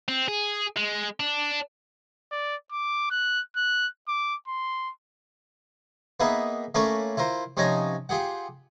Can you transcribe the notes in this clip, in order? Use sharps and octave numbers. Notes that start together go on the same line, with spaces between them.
C4
G#4
G#3
D4
D5
D6
F#6
F#6
D6
C6
A#3 B3 D#4 G#4 B4 E5
A3 A#3 C#4 A#4 B4 D5
E4 F4 A#4 C5
C3 F3 C#4 D#4 G#5 A#5
F4 G4 G#4 F#5